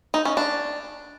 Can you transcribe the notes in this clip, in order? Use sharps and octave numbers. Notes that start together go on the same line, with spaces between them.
D#4
C#4
D4